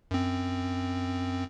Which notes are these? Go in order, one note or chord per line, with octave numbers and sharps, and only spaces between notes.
F#2 C4